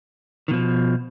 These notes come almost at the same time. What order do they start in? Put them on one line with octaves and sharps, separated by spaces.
D#3 B2 F3